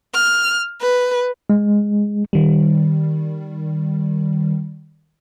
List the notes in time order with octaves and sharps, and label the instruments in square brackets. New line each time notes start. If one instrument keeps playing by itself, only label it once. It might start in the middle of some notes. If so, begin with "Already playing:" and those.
[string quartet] F6
B4
[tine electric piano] G#3
[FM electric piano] D#3 G3